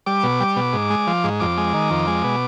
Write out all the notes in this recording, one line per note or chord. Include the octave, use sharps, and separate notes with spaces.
G3 D6
B2
G3
B2
G#2
G#3
F3
G#2
F2 D6
G#3
D#3
F2
G#3
B2